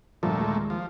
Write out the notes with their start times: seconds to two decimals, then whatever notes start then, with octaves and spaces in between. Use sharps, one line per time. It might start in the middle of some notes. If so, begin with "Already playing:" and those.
0.23 D2 G2 A#2 F3 A3
0.38 D#2 G#3
0.70 F3